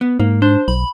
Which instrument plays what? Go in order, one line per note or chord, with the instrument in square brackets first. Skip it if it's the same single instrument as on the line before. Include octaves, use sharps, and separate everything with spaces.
[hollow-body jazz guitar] B3
[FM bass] G#2 [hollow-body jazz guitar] A#3
[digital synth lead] D4 [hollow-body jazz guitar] C5
[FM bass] B1 [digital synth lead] B5